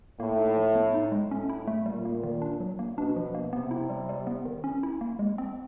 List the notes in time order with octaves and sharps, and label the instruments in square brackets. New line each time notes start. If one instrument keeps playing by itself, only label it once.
[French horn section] A2 [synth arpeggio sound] A#3
[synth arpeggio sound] D#4
F3
B3
D#4
G#3
[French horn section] A2 [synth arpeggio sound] C#4
[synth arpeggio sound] E4
A3
[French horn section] A#2 [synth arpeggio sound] G3
[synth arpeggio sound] A#3
D#3
D4
F#3
A#3
[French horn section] B2 [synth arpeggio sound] D4
[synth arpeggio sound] F3
A#3
[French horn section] C3 [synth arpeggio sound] B3
[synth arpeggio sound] E4
G3
G3
B3
D#3
C#4
E4
A#3
G#3
C4